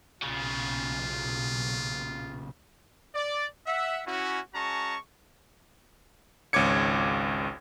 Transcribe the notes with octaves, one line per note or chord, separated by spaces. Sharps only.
B1 A#2 C#3 F4
D5
E5 F#5
C#4 E4 F#4
G#3 C#4 F#4 A5 A#5 C#6
G#1 C#2 C#5 D6 G#6 C#7